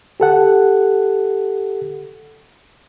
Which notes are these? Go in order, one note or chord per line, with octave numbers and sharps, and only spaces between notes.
G4 A4 F#5